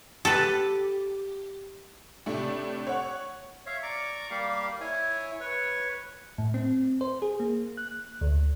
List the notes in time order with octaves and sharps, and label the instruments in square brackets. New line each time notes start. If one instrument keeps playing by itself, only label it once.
[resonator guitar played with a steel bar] G4 [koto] A4 B4
[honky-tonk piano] A2 C3 A3 D4
C#5 F#5
[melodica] C#5 E5 F5
D5 A#5 C#6 D6
G3 A#3 G4 F5
E4 C#5 G#5
B4 C#5 C#6
[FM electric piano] A2
C4
C5
G#4
A#3
F#6
D2